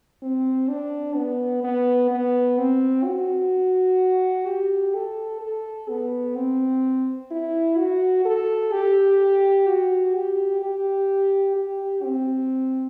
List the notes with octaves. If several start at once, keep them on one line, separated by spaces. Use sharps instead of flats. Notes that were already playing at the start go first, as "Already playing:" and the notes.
C4
D4
B3
B3
B3
C4
F#4
G4
A4
A4
B3
C4
E4
F#4
A4
G4
F#4
G4
G4
G4
C4